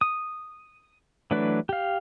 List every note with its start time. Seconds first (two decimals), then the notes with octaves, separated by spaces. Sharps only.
0.01 D#6
1.31 E3 F#3 A3 D4 B4
1.69 G4 F5